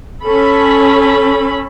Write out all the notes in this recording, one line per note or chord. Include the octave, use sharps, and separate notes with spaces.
C#4 A4 B5